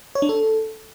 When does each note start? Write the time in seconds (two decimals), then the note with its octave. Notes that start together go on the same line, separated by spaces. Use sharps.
0.15 C#5
0.22 D4
0.29 A4